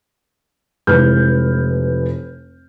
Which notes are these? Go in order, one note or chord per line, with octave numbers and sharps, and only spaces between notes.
F1 E3 G#3 B4 F6 G6